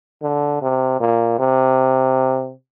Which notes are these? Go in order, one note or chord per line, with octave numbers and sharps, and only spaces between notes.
D3
C3
A#2
C3